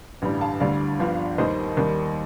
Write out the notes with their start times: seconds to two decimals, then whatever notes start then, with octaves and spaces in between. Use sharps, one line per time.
0.22 A1 G2 D3 G3
0.41 F5 A5
0.60 D2 D3 G3 D5 F5
0.99 G1 G2 F3
1.38 D#2 D#3 G3 C5 D#5
1.77 D#2 D#3 G3